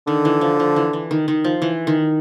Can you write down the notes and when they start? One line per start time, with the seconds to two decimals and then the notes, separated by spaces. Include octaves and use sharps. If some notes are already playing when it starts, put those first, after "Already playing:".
0.07 D3 D#3
0.25 E3
0.41 F3
0.60 F3
0.76 E3
0.93 E3
1.11 D#3
1.28 D#3
1.44 F3
1.62 E3
1.87 D#3